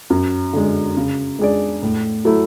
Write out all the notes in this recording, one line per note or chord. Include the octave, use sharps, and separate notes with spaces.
F#2
D3 G#3
C#3
G#3 D4 G#4 D5
A2
F#3 A3 E4 A4